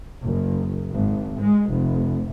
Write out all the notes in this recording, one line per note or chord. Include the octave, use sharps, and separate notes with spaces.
F#1
G#1
G#3
F1